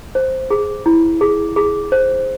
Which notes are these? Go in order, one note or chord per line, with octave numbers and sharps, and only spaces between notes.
C5
G#4
E4
G#4
G#4
C5